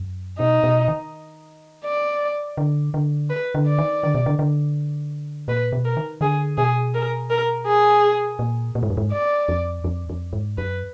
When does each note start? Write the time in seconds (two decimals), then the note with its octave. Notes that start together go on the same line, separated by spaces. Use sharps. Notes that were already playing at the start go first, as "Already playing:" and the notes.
Already playing: F#2
0.39 B2 D#4
0.63 B2
0.88 D#3
1.85 D5
2.57 D3
2.94 D3
3.30 B4
3.55 D3
3.67 D5
3.78 D#3
4.03 D3
4.15 B2
4.26 D3
4.39 D3
5.48 A#2 B4
5.72 B2
5.85 A#4
5.97 D#3
6.21 D3 G#4
6.57 B2 G#4
6.94 A#4
7.30 A#4
7.67 G#4
8.39 A#2
8.75 A#2
8.83 G#2
8.90 F#2
8.97 G#2
9.12 D5
9.49 F2
9.84 F2
10.09 F2
10.33 G#2
10.58 F#2 B4